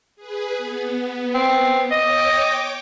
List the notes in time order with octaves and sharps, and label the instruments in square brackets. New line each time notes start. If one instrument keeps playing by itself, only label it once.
[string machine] G#4 B4
B3
[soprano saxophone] C4
[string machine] C#5 G5 D6 [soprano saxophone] D#5